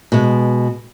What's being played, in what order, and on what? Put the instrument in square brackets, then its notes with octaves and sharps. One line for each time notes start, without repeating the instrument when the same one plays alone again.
[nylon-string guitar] B2 G#3